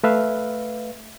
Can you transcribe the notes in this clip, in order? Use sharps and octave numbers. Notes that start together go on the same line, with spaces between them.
A3 B4 E5 F5